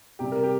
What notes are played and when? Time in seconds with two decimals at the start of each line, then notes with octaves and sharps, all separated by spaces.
0.19 C3 G3 G4
0.32 A#4
0.43 G4